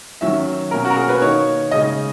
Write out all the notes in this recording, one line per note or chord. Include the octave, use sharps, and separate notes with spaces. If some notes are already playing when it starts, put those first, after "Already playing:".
D#3 F#3 C#4 E5
B2 A#3 C#4 A#4
F#4
A#4
G#4
B4
D#3 A#3 D#4 C#5
C#3 G#3 D#4 D#5